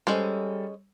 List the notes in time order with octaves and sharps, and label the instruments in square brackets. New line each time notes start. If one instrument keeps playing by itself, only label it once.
[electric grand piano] G3 A4 [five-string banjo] G#3 C#4 C5